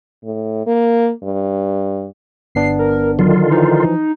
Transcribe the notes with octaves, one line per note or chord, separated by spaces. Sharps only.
A2
A#3
G2
G1 B3 D4 C7
A#4
D3 D#3 F#3 F4
E3 F3 D#4